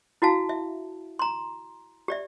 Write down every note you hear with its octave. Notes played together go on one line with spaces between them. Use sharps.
E4 F#4 F5 A5
E5
A#5 C6
G4 D5 E5